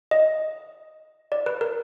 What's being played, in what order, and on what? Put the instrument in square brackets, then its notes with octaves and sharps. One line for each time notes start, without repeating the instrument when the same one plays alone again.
[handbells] D#5
D5
B4
A#4